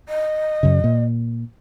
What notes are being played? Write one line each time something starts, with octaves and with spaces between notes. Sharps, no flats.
D#5
F#2 C#3
A#2